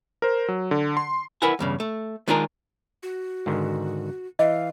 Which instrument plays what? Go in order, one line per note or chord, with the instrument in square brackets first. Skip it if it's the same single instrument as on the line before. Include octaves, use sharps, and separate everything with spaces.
[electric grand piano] A#4 C5
F#3
D3
C6
[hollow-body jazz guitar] E4 A#4 B4 E5 F#5 G#5
E2 G2 C#3
A3
D#3 G#3 D4 F4 G#4 A#4
[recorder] F#4
[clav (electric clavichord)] G#2 D3 D#3
[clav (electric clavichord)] E3 [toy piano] D#5 [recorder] F5